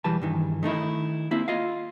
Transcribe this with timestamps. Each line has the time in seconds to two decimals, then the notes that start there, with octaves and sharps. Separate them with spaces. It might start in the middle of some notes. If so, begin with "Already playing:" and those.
0.04 B1 E2 E3 G3 B4 A5
0.22 G2 D#3 E3
0.63 D#3 A3 D#4 E4
1.31 A#3 C4 E4
1.48 F4 D#5 F5